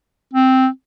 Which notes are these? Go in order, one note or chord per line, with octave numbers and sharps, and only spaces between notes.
C4